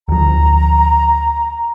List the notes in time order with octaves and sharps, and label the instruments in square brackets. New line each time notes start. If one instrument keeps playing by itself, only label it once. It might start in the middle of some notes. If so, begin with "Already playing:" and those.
[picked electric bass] D2 F3 [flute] A#5